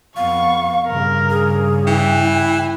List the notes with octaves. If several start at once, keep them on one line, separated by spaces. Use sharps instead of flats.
F2 B3 F5 C#6
G2 C#3 A#4
G#4
E3 G5
E4